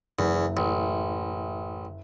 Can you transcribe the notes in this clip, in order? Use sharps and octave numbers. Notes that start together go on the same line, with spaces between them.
F#1 E2
A1